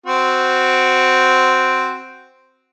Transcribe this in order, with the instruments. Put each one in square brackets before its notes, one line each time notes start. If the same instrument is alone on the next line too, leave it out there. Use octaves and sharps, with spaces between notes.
[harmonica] C4 F#4